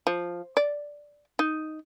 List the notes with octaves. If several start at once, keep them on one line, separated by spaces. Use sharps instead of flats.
F3
D5
D#4